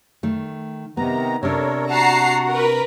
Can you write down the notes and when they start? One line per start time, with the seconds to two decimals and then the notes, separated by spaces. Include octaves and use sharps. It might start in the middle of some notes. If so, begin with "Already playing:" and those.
0.23 D#3 A3
0.97 C3 D#3 B3 A#5
1.43 C3 D4 A4 A#4 C#5
1.90 F#4 F#5 A5 A#5 C7
2.50 A#4 B4